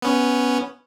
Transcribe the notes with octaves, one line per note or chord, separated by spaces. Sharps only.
B3 C#4